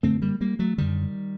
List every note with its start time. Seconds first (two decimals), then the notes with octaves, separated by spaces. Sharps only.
0.03 F#2 D3 A3 C4
0.22 G3 A#3
0.41 G3 A#3
0.59 F#3 A3
0.78 F#2 D3 D#3 G3